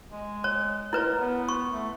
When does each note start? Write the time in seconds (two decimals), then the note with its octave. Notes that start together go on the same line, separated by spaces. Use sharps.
0.11 G#3
0.44 C#5
0.93 E4 A#4 B4 C#5
1.19 B3
1.49 C#6
1.73 A3